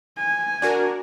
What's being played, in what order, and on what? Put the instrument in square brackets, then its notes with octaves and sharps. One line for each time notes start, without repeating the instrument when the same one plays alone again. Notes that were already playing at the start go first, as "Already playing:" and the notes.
[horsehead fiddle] G#5
[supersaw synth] D4 F#4 A#4